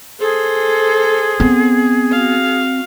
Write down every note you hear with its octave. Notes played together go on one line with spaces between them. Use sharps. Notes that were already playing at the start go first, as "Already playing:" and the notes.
G#4 A4 C5
B3 C4
F#4 F5